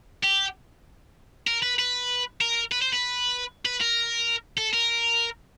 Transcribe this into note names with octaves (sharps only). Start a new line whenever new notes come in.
G4
A#4
B4
B4
A#4
B4
C5
B4
B4
A#4
A4
A#4